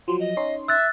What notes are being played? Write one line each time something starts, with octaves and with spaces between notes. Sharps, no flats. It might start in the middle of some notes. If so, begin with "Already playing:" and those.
F3 F#3 C6
D#5
C#4 D#4 C6
E5 E6 F#6 A6